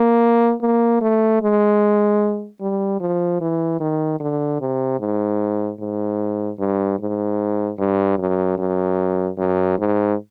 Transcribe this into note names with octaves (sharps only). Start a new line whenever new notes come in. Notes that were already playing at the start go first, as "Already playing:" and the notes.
Already playing: A#3
A#3
A3
G#3
G3
F3
E3
D#3
D3
C3
G#2
G#2
G2
G#2
G2
F#2
F#2
F#2
G#2